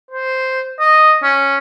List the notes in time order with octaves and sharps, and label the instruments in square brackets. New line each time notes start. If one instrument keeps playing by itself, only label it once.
[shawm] C5
D#5
C#4